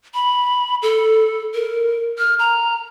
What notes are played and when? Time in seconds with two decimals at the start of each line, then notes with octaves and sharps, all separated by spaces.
0.14 B5
0.82 A4
1.54 A#4
2.18 F6
2.39 A#5